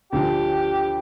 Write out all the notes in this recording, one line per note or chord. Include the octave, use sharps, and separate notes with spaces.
D2 D3 F3 G4